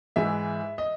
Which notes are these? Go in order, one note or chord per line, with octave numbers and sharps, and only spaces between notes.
G#2 E3 G#3 E5
D#5